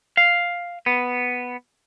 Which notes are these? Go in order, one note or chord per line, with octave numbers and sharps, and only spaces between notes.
F5
B3